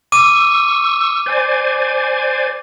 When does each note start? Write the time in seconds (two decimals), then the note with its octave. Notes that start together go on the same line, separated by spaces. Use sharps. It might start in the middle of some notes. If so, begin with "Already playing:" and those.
0.12 C#6 D6 E6 D#7
1.26 C5 D5 G#5